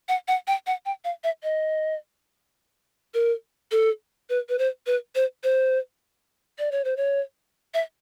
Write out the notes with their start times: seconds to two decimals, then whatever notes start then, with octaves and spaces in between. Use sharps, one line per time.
0.09 F#5
0.28 F#5
0.48 G5
0.67 F#5
0.86 G5
1.04 F5
1.24 E5
1.43 D#5
3.14 A#4
3.72 A4
4.30 B4
4.49 B4
4.59 C5
4.87 B4
5.15 C5
5.44 C5
6.59 D5
6.72 C#5
6.85 C5
6.97 C#5
7.74 E5